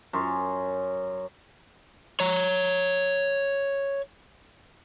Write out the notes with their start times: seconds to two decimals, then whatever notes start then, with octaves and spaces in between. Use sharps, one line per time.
0.13 F#2 C#5 C6
2.20 C#5 A#5